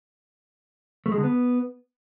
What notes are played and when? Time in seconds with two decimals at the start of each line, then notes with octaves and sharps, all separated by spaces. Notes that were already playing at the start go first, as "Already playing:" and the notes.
1.06 A3
1.12 G#3
1.18 D3
1.24 B3